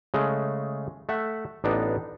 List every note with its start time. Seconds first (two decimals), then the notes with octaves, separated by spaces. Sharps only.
0.14 C#3 G#3 A3
1.09 A3 E5 F#5
1.64 A1 B3 D4 D#4